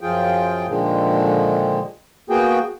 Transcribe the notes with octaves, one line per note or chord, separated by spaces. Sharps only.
F#2 F3 F4 G#4 G5
A#2 D3 D#3 F3 G#3
A#3 B3 F#4 G#4 G5